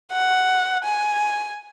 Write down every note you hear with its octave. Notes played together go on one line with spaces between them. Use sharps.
F#5
G#5